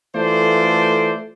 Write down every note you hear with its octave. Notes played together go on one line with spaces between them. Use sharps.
E3 A3 F4 A4 C5 D5